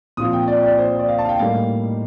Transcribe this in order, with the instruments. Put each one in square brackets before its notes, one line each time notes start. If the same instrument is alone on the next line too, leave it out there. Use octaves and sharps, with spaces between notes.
[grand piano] A#2 F3 C4 F4 D#6
G5
D5
D5
C5
C5
D5
F5
A5
F5
G5
A2 G3 A#3 D#4 F5